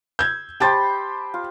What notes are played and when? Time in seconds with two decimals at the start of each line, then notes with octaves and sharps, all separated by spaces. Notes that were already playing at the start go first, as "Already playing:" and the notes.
0.19 E6 G6 G#6
0.60 G4 C5 G5 A5 B5 A6
1.34 F4